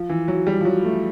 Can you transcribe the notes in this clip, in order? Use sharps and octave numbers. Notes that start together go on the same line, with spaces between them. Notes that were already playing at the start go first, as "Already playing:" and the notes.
Already playing: F3
E3
F#3
G3
F3
F#3
A3